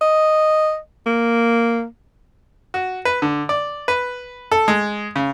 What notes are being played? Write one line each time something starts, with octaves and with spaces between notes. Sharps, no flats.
D#5
A#3
F#4
B4
D3
D5
B4
A4
G#3
C#3